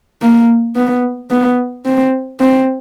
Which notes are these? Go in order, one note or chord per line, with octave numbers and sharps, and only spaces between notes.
A#3
B3
B3
C4
C4